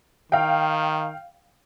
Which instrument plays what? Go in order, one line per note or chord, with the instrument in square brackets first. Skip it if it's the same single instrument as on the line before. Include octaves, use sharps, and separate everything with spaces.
[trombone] D#3 [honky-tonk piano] F5 G5